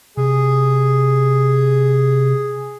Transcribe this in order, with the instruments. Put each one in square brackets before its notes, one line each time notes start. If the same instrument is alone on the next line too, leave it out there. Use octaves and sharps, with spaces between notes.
[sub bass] C3 [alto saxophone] G#4